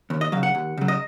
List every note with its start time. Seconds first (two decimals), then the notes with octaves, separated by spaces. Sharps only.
0.10 D#2
0.21 D#5
0.32 C#3 F#3 F5
0.43 F#5
0.55 D#2
0.78 C#3 F#3
0.88 D#5